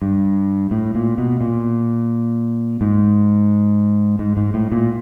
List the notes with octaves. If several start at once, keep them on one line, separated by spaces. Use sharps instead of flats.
G2
A2
A#2
B2
A#2
G#2
G#2
G#2
A2
A#2